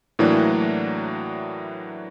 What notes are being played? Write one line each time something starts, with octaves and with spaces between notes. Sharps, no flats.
A2 E3 F#3 A#3 D4